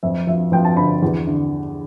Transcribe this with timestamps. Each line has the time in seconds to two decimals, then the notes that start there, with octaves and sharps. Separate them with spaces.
0.03 F2 E5
0.27 F3 E5
0.52 F3 G5
0.65 A5
0.77 D3 B5
1.03 E2
1.27 D3